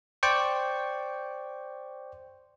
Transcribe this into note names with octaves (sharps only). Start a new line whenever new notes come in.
C5 D5 G5 C#6